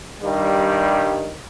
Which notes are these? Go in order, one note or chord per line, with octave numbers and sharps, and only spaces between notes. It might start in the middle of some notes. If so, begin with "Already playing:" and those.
G2 D#3 G3